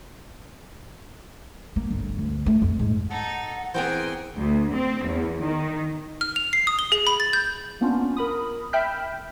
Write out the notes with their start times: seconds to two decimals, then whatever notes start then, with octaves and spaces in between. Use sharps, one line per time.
1.76 A#3
1.90 G1
2.18 D2
2.46 A3
2.62 F2
2.79 G#2
3.10 D#4 A4 F#5
3.74 E3 B3 C4 G#4 A#4 C5 G5
4.37 D2
4.74 C4
5.06 E2
5.43 D#3
6.21 F6
6.36 F7
6.53 C7
6.67 D#6
6.79 G7
6.92 G#4
7.07 B5
7.20 A6
7.33 G6
7.81 A#3 B3 C#4 D4 F4
8.17 A#4 B5 D#6
8.73 E5 G5 B5 F6 G6 B6